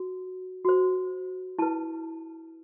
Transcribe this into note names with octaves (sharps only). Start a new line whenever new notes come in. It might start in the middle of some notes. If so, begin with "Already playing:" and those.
Already playing: F#4
F#4 C5
E4 B4 A5